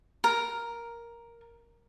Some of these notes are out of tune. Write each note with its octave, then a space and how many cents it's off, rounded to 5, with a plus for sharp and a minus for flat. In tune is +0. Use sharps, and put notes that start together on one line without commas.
A#4 +5